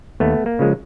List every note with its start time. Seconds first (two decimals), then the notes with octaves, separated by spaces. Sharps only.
0.20 D#2 A3 B3
0.46 A#3
0.59 C#3 F3 G#3